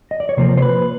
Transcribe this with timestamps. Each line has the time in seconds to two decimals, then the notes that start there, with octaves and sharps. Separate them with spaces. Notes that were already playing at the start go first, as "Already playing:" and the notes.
0.11 D#5
0.20 D5
0.29 C#5
0.37 C3 F3 A#3 C5
0.57 C5
0.62 B4